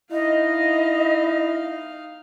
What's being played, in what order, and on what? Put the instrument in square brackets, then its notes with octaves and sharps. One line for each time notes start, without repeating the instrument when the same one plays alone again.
[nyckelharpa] D#4 F5 [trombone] E4 [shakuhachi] D#5